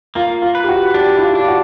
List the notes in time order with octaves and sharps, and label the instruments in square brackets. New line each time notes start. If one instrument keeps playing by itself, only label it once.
[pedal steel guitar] A#3 [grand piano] F4
[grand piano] F4
[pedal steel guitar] B4
[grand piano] G4
F#4
[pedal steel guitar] D4 [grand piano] G4
[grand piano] E4
F4
[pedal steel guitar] D4
[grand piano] F4
F#4